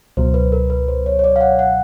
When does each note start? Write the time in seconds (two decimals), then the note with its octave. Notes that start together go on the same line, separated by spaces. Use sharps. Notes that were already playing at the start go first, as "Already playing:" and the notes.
0.17 C#2 B2 F#3 C5
0.34 B4
0.52 A#4
0.70 B4
0.88 C5
1.06 C#5
1.19 C#5
1.24 D5
1.36 F5
1.41 F#5
1.59 F#5